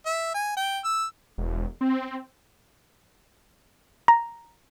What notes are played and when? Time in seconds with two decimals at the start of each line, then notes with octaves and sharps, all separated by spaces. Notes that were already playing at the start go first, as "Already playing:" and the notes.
0.06 E5
0.34 G#5
0.57 G5
0.84 E6
1.38 E1
1.81 C4
4.08 A#5